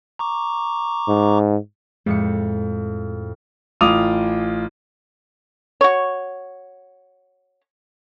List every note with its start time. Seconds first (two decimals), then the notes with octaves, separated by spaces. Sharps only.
0.19 A#5 C#6 D6
1.08 G#2
2.06 F2 A2 G#3 C#7
3.81 A1 F4 D6 D#6 F7
5.81 F#4 C#5